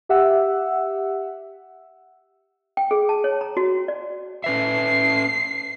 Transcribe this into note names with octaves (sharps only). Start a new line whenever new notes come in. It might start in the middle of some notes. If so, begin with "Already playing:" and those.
G4 E5 F#5 E6
G5
G#4
A5
C#5
A#5
F#4
D5
C#4 B4 E5 C7